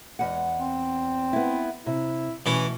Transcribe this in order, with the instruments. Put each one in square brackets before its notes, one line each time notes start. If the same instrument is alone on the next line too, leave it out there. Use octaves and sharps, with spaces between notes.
[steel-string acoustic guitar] E2 F#5 [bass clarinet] G#3
[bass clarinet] C4
[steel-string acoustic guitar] B3 E4
[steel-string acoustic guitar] C3 [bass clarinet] E4
[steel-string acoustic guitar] B2 [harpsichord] E3 C#4 [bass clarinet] A3